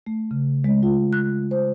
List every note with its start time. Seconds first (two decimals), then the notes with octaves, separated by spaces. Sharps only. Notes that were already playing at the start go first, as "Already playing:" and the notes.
0.07 A3
0.31 C#3
0.64 G#3
0.83 F4
1.13 F#6
1.51 C5